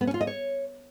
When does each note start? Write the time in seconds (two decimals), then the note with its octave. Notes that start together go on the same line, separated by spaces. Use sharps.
0.01 B3
0.07 C#4
0.14 F4
0.21 D#5
0.27 C#5